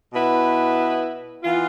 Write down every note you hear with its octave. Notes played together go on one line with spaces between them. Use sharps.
B2 B3 E4 B4
E3 B3 F4